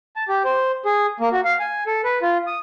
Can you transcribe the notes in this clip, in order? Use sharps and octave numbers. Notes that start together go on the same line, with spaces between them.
A5
G4
C5
G#4
A#3
F#4
F5
G#5
A4
B4
F4
D#6